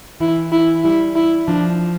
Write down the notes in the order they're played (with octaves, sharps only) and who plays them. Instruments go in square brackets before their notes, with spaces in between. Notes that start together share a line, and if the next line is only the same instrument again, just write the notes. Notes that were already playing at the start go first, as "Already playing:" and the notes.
[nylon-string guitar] E3 [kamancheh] E4
[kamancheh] E4
[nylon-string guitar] G3 [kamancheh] E4
[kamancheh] E4
[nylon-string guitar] F3 [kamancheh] D4